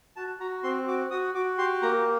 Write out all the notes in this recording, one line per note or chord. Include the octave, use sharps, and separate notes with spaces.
F#4 A5
F#4 A#5
C4 C6
F#4 D6
F#4 D#6
F#4 D6
G4 C6
A#3 A#5